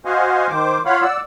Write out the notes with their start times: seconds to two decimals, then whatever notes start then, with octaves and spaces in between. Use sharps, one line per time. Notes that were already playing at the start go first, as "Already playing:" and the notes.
0.05 F#4 C5 D#5 F5 F#5 G#5
0.50 D#3 C5 D6
0.85 F4 C#5 F5 F#5 B5
1.02 D5 F#5 E6